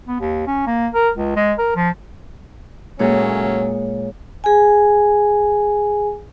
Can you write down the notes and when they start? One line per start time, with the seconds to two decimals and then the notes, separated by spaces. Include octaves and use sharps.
0.08 B3
0.20 D#2
0.47 C#4
0.67 A#3
0.93 A#4
1.16 C#2
1.36 G#3
1.58 A#4
1.76 F3
2.99 A#2 F#3 G#3 A3 C#4 G#4 C#5
4.44 G#4 G#5